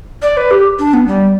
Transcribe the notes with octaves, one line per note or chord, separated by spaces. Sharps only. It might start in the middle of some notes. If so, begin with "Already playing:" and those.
D5
B4
G4
D4
B3
G3